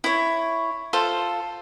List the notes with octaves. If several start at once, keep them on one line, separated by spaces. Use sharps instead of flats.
E4 C#5
F4 A4 C5